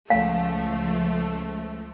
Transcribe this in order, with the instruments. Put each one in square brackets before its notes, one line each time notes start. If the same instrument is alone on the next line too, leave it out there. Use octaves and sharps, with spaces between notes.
[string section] C#2 F3 A3 [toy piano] F5